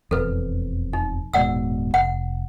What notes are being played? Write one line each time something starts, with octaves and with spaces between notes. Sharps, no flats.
E1 F2 A4 B4
D#4
D#1 G#2 B2 D5 F#5 E6
F1 F#5